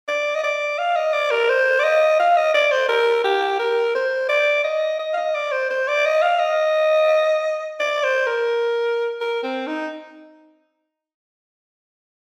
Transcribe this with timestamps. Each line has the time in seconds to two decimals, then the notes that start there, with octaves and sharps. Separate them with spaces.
0.08 D5
0.35 D#5
0.44 D5
0.78 F5
0.96 D#5
1.13 D5
1.31 A#4
1.49 C5
1.79 D5
1.84 D#5
2.20 F5
2.37 D#5
2.54 D5
2.71 C5
2.89 A#4
3.24 G4
3.59 A#4
3.95 C5
4.29 D5
4.64 D#5
4.99 D#5
5.13 F5
5.17 D#5
5.35 D5
5.52 C5
5.70 C5
5.88 D5
6.05 D#5
6.22 F5
6.39 D#5
7.80 D5
8.04 C5
8.27 A#4
9.21 A#4
9.43 C4
9.67 D#4